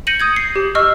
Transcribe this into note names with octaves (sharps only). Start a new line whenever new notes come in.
G6 A#6 C#7 D#7 F#7
D#6 G6 G#6
C7
G4
D#5 C#6 E6 F6